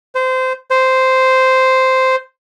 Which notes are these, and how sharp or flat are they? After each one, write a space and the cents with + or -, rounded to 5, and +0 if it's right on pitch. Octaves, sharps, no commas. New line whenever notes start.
C5 -20
C5 -5